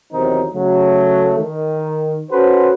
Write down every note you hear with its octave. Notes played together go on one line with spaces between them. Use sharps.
E2 C3 D#3 F#3 C4 D#4
C#3 F#3 A3
D#3
C#4 F#4 A4 B4 C5